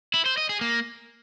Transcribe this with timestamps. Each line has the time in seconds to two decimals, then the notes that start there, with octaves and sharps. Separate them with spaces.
0.14 E4
0.26 C5
0.37 D#5
0.49 G#4
0.61 A#3